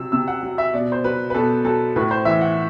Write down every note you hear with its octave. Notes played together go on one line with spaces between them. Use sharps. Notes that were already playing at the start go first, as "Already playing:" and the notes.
Already playing: C3 F#3 E6
C3 E6
F#5
F#3
E5
B2 D5
C5
F#3 B4
B4
B2 A4
F#3 A4
A2 B4
C5
E3 E5
F#5